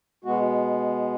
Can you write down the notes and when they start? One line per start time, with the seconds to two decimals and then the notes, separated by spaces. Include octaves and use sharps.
0.24 B2 G#3 B3 F#4